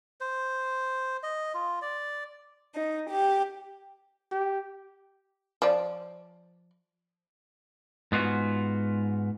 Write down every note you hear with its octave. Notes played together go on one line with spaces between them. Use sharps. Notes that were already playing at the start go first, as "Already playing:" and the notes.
C5
D#5
F4
D5
D#4
G4
G4
F3 D5
G#2 B3 F4 F#4